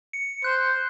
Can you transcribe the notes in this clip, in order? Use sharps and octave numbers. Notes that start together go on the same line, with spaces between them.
C#7
C5 F#6